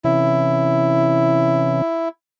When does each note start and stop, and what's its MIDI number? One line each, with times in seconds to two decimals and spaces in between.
0.04 1.82 48
0.04 1.82 52
0.04 1.82 61
0.04 2.09 64